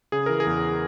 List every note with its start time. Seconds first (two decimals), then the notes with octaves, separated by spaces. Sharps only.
0.12 C#3 G#4
0.26 E3 A#4
0.40 G#4
0.47 E2